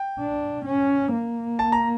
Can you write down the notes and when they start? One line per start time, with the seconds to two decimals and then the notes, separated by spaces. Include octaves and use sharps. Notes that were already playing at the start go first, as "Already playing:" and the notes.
Already playing: G5
0.20 D4
0.65 C#4
1.12 A#3
1.59 A5
1.72 A#5